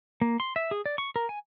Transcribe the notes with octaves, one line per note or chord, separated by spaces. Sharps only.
A#3
C6
E5
G#4
D5
C#6
A#4
G#5